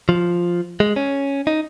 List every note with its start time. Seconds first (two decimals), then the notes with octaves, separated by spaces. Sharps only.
0.09 F3
0.80 G#3
0.96 C#4
1.47 D#4